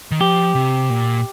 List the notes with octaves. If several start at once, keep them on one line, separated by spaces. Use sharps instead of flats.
D#3
F3 G4
C3
A#2